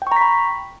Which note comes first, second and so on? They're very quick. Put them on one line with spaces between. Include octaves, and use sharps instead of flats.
G5 C#6 A#5 B6 B5